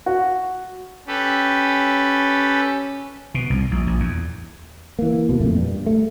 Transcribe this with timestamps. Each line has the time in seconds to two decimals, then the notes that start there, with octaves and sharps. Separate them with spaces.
0.06 F#4
1.07 C#4 G4 A4 B4
3.34 B2
3.50 C2
3.71 A#1
3.87 A#1
4.00 E2
4.99 E3 A#3
5.29 D#2 B2
5.40 F2 A#2 A3
5.56 G2
5.87 A3